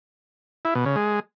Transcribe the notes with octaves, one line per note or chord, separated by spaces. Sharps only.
E4
B2
C#3
G#3